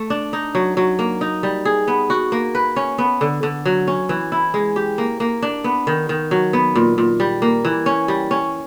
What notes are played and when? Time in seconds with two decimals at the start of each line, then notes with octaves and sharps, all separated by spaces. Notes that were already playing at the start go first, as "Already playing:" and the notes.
Already playing: A3
0.10 D4
0.33 D#4
0.55 F#3
0.77 F#3
0.99 A#3
1.21 D#4
1.43 G3
1.65 G#4
1.88 B3
2.10 F#4
2.32 A#3
2.55 B4
2.76 C#4
2.98 B3
3.21 D3
3.43 D3
3.65 F#3
3.87 C#4
4.09 E3
4.32 E4
4.54 G#3
4.76 G4
4.98 A#3
5.20 A#3
5.42 D4
5.64 B3
5.87 D#3
6.09 D#3
6.31 F#3
6.53 B3
6.76 A#2
6.98 A#2
7.20 G3
7.42 A#3
7.65 E3
7.86 C#4
8.08 G3
8.31 C#4